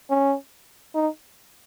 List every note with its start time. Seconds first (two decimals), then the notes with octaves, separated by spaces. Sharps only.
0.10 C#4
0.95 D#4